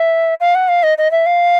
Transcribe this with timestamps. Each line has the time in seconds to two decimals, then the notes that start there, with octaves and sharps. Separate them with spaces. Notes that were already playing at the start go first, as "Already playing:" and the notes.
Already playing: E5
0.40 F5
0.55 F#5
0.68 F5
0.83 D#5
0.98 D#5
1.11 E5
1.26 F5